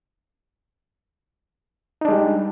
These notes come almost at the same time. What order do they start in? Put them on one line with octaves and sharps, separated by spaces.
D#4 D4 G#3 G3